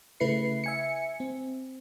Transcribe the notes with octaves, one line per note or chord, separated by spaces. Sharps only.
C#3 A3 E4 B4 C7 C#7
E5 G#5 C#7
C4